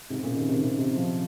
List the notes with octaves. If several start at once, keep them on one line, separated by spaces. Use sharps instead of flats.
G#2 C3
A#2 C#3
C3 D#3
C3 D#3
C3 D#3
C3 D#3
C#3 F3